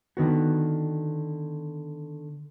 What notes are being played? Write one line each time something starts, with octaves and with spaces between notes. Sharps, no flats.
D3 D#3 B3 F#4